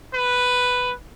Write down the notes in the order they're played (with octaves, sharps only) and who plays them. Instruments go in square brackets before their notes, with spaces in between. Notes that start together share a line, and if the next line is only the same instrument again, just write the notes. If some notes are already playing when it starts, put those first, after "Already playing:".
[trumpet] B4